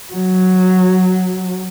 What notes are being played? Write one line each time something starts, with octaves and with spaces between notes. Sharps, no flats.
F#3